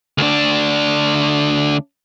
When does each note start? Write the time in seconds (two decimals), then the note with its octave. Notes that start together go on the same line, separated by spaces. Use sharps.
0.18 D2 D4